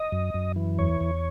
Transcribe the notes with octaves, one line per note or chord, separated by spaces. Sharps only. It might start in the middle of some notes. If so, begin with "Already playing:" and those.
Already playing: D#5
F#2
F#2
E3
E2 C#5
E2